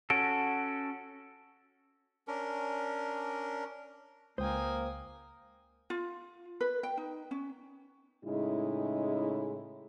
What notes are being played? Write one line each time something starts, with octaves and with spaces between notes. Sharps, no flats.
C#4 F#4 A4 D7
C#4 D4 A#4
C#2 A#3 C5 G5 G#5 D#6
F4
B4
G5
D#4
C#4
A2 C#3 G#3 D#4 E4